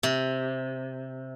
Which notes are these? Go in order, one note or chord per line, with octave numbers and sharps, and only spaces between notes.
C3